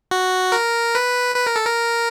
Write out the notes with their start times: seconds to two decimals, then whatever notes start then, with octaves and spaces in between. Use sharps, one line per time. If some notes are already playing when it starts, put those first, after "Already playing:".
0.11 F#4
0.52 A#4
0.95 B4
1.36 B4
1.47 A#4
1.56 A4
1.66 A#4